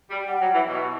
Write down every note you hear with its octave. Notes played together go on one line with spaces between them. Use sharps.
G3
G3 F#5
F#3
E3
B2